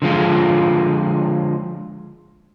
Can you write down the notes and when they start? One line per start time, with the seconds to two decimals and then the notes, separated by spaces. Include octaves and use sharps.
0.02 D3 F3 G#3 F4